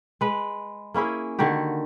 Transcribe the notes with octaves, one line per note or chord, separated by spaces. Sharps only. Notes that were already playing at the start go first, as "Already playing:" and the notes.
G#3 B4
A#3 C#4 E4 G#4
D3 D#3 F#4 G4